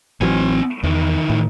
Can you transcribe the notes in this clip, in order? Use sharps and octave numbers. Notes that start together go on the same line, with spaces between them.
A1 E3 F#3 C4 G#5
E2 D#3 E3
A2